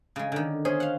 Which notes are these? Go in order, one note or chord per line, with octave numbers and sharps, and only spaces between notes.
C#3 G#3
D3 D#3
C#4 G#4 C5
F5 F#5